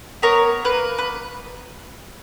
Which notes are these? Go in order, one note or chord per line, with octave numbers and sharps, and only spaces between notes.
B3 A#4 C#5
A#3 B4
B4